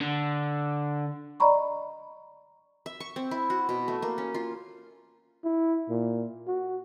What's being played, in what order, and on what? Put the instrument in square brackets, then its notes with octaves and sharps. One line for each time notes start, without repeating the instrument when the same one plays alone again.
[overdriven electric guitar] D3
[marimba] D5 D#5 A#5 B5 C#6
[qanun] E5
C#6
C4
E4
F#4
B2
A3
A#3
C#4
F4
[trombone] E4
A#2
F#4